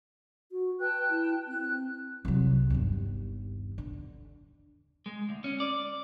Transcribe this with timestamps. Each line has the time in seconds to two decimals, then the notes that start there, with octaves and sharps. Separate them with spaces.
0.52 F#4
0.81 B4 G5 A5 F#6
1.10 E4
1.47 C4 F#6
2.25 C2 F#3
2.70 G1 D#2
3.78 D3
5.06 G#3
5.29 D2
5.44 C#4
5.60 D5